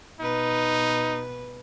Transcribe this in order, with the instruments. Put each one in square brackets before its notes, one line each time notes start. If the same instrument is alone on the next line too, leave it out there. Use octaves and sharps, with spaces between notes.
[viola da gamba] B2 B4 [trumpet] D#4